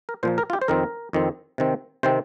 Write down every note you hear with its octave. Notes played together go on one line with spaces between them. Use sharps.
A#4
A#2 F3 A#3 C5
A#4
F4
G4
C5
F2 D#3 C4 A#4
F2 D#3 C4
C3 D#3 C4
C3 D#3 C4 C5